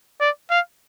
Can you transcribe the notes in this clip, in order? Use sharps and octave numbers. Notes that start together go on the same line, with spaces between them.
D5
F5